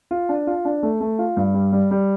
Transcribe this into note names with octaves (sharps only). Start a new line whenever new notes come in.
F4
D4
F4
D4
A3
A3
F4
G2
G3
G3
G3